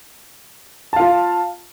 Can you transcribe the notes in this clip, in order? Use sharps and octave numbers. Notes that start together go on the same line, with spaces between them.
F4 F5 A5